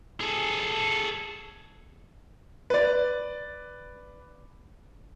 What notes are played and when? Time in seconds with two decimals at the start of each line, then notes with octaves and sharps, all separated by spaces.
0.20 G#4 A4
2.70 B4 D5